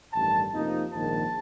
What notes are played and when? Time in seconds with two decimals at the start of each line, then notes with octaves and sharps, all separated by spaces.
0.13 A1 G2 D#3 A5
0.52 F2 C3 F3 A#3 D#4
0.92 A#1 G#2 D#3 A5